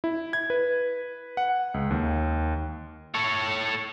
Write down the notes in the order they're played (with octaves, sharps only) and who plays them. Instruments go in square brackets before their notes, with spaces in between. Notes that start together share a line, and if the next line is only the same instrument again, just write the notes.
[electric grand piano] E4
G#6
B4
F#5
C#2
D#2
[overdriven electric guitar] A4 C#5